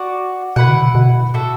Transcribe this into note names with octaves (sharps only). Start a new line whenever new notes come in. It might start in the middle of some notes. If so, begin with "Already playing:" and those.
Already playing: F#4 D5 F#5
B2 E4 B4 F#5
D3
B2
B2
A2 F#4 A4 E5